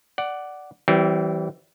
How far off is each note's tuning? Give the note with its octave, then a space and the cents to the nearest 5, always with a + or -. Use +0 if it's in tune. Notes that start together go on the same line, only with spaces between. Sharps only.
D5 +0 F#5 +10
E3 -10 G3 -35 C4 +0